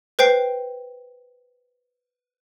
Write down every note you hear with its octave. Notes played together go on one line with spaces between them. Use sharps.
B4 C5 G5 C7